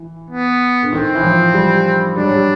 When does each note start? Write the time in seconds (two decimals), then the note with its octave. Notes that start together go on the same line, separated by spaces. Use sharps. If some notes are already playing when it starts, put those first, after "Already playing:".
Already playing: E3
0.31 B3
0.83 D3
0.93 D#3 C4
1.15 E3
1.23 F3
1.54 G3
2.16 G3 D4
2.24 F#3
2.31 G3